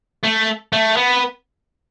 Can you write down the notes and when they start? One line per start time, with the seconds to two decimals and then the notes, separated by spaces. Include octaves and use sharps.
0.24 A3
0.73 A3
0.97 B3